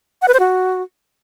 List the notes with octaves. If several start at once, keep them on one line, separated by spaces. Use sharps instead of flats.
F#5
B4
C5
F#4